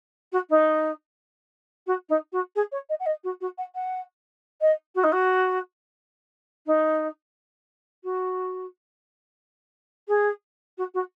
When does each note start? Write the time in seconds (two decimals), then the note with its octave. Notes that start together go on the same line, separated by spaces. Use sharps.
0.32 F#4
0.50 D#4
1.87 F#4
2.09 D#4
2.32 F#4
2.55 G#4
2.72 C#5
2.89 D#5
2.99 F#5
3.06 D#5
3.24 F#4
3.41 F#4
3.58 F#5
3.75 F#5
4.61 D#5
4.95 F#4
5.03 D#4
5.12 F#4
6.66 D#4
8.04 F#4
10.08 G#4
10.78 F#4
10.94 F#4